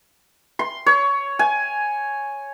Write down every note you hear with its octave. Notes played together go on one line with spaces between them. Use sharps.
C6
C#5
G#5